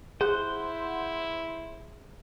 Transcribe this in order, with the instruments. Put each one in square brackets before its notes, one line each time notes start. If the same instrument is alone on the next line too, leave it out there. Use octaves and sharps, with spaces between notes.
[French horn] E4 [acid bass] G#4 [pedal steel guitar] C5 [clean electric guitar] F#5